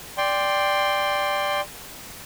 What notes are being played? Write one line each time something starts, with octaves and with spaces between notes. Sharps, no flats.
D5 G5 C6